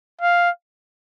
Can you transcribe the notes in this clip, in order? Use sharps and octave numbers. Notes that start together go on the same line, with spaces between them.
F5